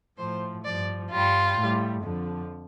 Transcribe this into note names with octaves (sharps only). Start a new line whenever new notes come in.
A2 F3 C5
G2 F3 D5
G2 G3 F4
A2 G3
F2 D3 F3